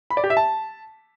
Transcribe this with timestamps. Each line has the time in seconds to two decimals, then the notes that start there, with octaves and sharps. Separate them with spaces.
0.10 B5
0.17 D5
0.24 G4
0.30 E5
0.37 A5